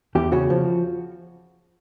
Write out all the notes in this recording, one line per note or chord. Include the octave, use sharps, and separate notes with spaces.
E2 G4
C#3 F#4
F3